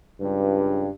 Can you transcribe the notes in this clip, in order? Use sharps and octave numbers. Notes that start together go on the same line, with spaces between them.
C#2 G2